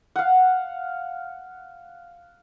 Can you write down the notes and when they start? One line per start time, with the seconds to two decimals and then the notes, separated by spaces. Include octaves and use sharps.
0.16 F5 F#5